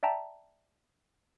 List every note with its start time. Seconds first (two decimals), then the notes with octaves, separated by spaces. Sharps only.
0.03 D5 E5 G5 A5 A#5